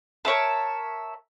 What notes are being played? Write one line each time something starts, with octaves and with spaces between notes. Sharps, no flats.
A#4 C#5 E5 A5